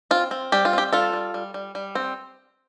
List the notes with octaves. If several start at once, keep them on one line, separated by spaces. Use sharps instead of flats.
C4 F4
C4
G3 G4
F4
C4 G4
G3 F4 A4
G3
G3
G3
G3
C4